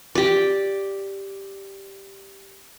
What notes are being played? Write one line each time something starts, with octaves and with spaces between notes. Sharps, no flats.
G4 D5